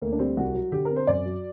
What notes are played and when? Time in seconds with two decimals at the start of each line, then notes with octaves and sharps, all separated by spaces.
0.02 D2 A#3
0.12 D4
0.19 G3 C4
0.37 C2 F#4
0.55 F#3
0.72 D3 G4
0.85 A#4
0.90 C4
0.96 C5
1.07 F#2 D5
1.26 F#3